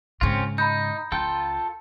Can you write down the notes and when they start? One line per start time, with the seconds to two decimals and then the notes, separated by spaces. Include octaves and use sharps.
0.21 G#2 C#3 C4 C#4 F4
0.58 D#4 A#5 B5 G6
1.12 C#2 F4 A4 G5